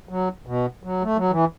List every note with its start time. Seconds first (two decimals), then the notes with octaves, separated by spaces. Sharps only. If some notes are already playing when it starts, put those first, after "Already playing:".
0.09 F#3
0.47 B2
0.83 F#3
1.03 A3
1.17 F#3
1.30 E3